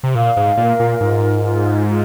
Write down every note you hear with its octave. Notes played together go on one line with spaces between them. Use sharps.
C3
A#2 F5
G#2
A#2 A#4
A#2
G#2 F4
F4
F4